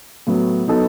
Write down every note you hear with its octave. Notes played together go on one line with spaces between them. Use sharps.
A2 F#3 B3
F#3 B3 D#4 A4